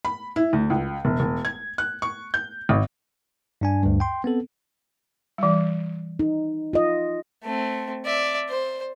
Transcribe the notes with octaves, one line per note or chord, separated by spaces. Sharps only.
B5
E4
D2
C#2
E1
E1
G#6
F#6
C#6
G6
G#1
G2 D4 G#5
D2 G2
G5 C6
B3 C4 A4
E3 G3
D#4
F4 D#5
A3 C4
D5 E5
C5